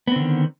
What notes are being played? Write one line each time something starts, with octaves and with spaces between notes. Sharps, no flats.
D3 D#3 B3 C4